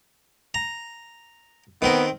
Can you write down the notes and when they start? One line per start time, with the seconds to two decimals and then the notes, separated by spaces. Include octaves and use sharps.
0.54 A#5
1.82 D#3 B3 C4 A#4